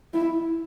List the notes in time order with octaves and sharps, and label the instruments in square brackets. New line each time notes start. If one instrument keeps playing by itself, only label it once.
[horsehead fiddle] E4